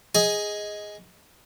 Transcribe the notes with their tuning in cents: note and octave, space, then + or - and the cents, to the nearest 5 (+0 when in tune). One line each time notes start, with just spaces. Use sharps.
G#4 +0 D#5 +10